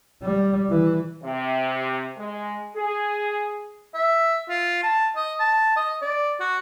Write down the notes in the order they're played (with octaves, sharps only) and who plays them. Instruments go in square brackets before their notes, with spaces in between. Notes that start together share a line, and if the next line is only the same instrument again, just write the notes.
[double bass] G3
E3
[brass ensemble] C3
G#3
G#4
[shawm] E5
F4
A5
D#5
A5
D#5
D5
F#4